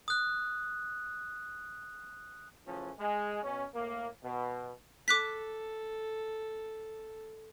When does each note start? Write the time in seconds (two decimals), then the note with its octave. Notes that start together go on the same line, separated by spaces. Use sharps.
0.08 D#6 F#6
2.67 A2 C#3 E3 F3 C#4
2.99 G#3
3.43 B2 C#4
3.74 A2 A#3
4.23 B2
5.08 A4 D6 F#6 B6